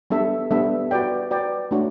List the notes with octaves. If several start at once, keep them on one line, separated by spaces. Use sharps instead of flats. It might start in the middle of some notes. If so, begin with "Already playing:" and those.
G3 B3 D4 A4 E5
G3 B3 D4 A4 E5
F#4 B4 D5 G5
F#4 B4 D5 G5
A3 D4 F#4 C#5